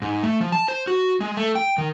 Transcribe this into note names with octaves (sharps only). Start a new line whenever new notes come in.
G#2
A3
F3
A5
C5
F#4
G#3
A3
G5
D#3